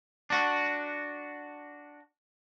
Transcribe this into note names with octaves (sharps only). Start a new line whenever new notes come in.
D4 F#4